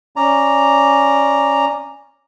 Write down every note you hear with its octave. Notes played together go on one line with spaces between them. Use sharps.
C#4 D5 A#5